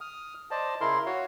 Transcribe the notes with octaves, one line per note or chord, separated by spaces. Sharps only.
D#6 F6
C5 D5 D#5 A5
C#3 E4 A#4 C6
F#4 C#5 F5